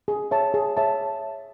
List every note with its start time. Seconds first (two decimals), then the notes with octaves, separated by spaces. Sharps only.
0.08 G#4
0.31 C#5 E5 A5
0.54 G#4
0.77 C#5 E5 A5